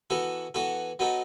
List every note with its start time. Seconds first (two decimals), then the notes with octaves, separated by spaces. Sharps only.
0.10 E3 B3 F#4 A4
0.54 E3 B3 F#4 A4
0.99 F#3 B3 D#4 A4